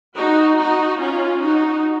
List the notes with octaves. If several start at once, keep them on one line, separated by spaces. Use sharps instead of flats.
D#4 F#4
D#4 F#4
C#4 F4
D#4 F#4